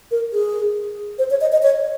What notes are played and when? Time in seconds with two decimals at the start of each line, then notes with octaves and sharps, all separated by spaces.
0.11 A#4
0.33 G#4
1.19 C5
1.30 C#5
1.41 D#5
1.52 D#5
1.62 C#5